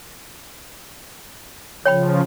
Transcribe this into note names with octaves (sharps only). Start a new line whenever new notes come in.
C#3 F3 C#5 G5 B5